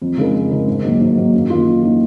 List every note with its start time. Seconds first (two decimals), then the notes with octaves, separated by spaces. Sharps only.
0.02 F2
0.17 C#3 G#3 D#4 A#4
0.35 F2
0.51 C#3 G#3 D#4 A#4
0.68 G#2
0.84 D#3 F#3 A#3
1.00 G#2
1.17 D#3 F#3 A#3
1.34 F#2
1.50 D#3 A#3 F4
1.67 F#2
1.83 D#3 A#3 F4